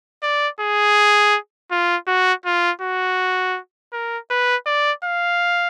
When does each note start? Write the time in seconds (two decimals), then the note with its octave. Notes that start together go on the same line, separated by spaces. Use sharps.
0.23 D5
0.61 G#4
1.71 F4
2.08 F#4
2.46 F4
2.82 F#4
3.93 A#4
4.31 B4
4.67 D5
5.05 F5